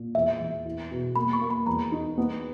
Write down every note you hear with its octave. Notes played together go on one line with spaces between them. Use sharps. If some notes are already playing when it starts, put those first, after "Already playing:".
Already playing: A#2
E2 E5
E2
E4
B2
A#3 B5
C#6
A#3
B5
E2 A#5
D#4
B3